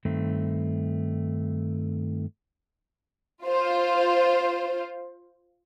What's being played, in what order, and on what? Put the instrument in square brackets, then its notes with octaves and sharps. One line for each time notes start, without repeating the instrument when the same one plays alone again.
[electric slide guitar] G2 D#3 A3 C4
[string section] F4 C5